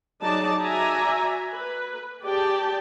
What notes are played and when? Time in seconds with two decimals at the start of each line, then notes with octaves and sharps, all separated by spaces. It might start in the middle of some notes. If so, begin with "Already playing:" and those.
0.21 F#3 D#4 G#4 D5 A5
0.61 F#4 D5 E5 G#5 A#5
1.53 B4
2.23 G4 G#4 D5 G5 A5